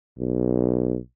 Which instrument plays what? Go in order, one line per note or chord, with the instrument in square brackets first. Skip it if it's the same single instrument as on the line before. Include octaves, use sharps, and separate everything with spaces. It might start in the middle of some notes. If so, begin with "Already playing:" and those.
[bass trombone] B1